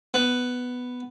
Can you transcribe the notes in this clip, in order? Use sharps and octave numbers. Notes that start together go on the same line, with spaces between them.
B3